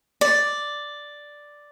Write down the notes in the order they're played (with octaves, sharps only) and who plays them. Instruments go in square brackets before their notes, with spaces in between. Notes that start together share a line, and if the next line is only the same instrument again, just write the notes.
[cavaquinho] D5